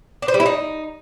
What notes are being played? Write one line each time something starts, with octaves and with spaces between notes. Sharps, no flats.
D4
C5
G3
E4
D#4